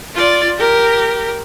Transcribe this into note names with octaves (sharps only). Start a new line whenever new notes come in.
F4 D5
G4 A#4